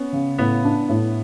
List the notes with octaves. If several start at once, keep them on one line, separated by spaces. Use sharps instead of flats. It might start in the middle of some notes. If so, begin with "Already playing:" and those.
Already playing: B3 C#4
C#3
A2 B3
D4
A2